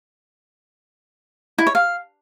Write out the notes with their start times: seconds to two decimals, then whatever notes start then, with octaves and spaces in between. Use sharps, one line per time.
1.58 E4
1.67 C#5
1.75 F5